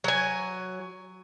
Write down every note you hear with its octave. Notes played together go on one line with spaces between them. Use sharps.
F#3 G#5